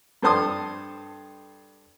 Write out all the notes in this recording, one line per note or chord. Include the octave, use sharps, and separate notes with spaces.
G2 A4 C5 A5 C6 D#6